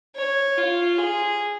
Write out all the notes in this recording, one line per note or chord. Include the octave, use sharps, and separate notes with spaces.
C#5
F4
G#4